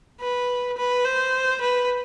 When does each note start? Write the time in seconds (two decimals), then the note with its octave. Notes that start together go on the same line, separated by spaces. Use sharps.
0.21 B4
0.77 B4
1.05 C5
1.61 B4